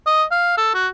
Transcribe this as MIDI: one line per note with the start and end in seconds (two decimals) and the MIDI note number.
0.06 0.23 75
0.31 0.53 77
0.57 0.70 69
0.74 0.88 66